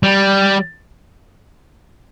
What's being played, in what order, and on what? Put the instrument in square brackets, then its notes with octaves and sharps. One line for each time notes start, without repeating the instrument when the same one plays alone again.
[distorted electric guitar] G3